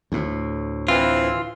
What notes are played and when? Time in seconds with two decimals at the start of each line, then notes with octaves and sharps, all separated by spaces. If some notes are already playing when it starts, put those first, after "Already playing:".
0.12 D2 A2
0.88 E3 C4 F4